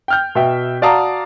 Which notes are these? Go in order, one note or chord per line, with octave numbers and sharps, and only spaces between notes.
G5 F6 G6
B2 E5 G5
F#4 D5 F5 A5 A#5 D#6